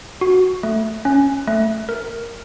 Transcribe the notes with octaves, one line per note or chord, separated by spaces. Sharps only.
F#4
A3
C#4
A3
A#4